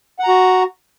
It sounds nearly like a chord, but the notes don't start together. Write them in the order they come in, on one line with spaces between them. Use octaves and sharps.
F#5 A#5 F#4